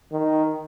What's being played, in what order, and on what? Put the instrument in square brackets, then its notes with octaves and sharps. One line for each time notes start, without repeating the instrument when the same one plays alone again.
[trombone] D#3